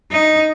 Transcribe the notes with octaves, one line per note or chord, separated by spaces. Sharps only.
D#4